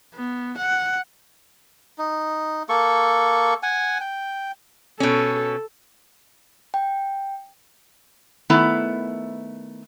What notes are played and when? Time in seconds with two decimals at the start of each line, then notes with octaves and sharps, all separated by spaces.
0.14 B3
0.58 F#5
1.98 D#4
2.69 A#3 A4 C#6
3.63 F#5 G#5
4.01 G5
5.00 B2 C#4 A4
6.74 G5
8.50 D#3 A3 B3 E4